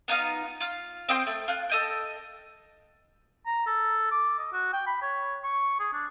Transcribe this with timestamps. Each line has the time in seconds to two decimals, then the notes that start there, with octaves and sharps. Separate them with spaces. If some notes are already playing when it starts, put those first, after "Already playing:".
0.08 B3 D#4 F4 F6
0.60 F4 F5
1.09 C4 D#5 G5 C6
1.27 A3
1.48 F4 F#6
1.70 A4 D#5 G5
3.46 A#5
3.67 A4
4.11 D6
4.39 D#5
4.53 F#4
4.73 G5
4.87 B5
5.02 C#5
5.44 C#6
5.79 G#4
5.93 D4